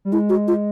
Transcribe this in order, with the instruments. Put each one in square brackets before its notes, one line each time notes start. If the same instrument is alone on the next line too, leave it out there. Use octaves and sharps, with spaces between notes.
[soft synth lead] G3
[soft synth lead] G#3 [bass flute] E4
[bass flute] F#4
F4